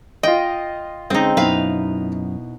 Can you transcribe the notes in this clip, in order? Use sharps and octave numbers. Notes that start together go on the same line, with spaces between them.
F4 D#5 G5
D3 G#3 C4 C#4 D#4
F#2 B2 D#4 E4 B4 F5